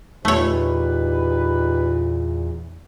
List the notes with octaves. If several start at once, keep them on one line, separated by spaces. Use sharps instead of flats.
E2 A#2 A3 D#4 G4 B4 C#5